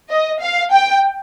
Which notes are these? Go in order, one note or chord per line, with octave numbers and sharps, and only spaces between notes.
D#5
F5
G5